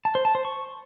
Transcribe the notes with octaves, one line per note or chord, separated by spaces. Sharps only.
A5
C5
A5
C5
C#6